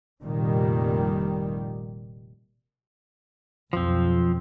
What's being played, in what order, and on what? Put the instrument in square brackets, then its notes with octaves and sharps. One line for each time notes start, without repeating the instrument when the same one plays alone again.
[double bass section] F1 A#2 D#3 G3
[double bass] B1 F2 [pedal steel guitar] F3 C4